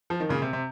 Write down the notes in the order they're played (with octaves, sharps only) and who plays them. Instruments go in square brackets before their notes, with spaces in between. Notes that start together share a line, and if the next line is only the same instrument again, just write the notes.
[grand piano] F3
D#3
A#2 C#3
C3
C3